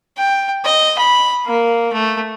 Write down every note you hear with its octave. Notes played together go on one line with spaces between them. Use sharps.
G5
D#5
B5
A#3
A3